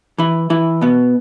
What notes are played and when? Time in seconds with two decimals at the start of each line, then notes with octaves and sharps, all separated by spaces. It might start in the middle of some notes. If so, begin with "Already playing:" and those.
0.18 E3 E4
0.50 E3 E4
0.81 B2 B3